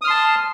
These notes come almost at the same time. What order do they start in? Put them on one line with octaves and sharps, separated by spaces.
D#6 F6 C6 A5